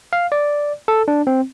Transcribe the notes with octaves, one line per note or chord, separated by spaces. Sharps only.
F5
D5
A4
D4
C4